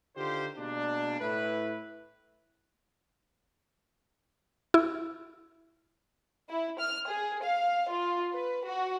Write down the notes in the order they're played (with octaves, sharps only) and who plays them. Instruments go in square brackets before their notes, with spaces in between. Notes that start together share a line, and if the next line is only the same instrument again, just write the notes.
[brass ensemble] D3 D#3 F4 G4 C5
B2 G#3 A#3 D4
A2 E4 B4
[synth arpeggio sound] E4
[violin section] E4
F6
G#4
F5
F4
B4
F#4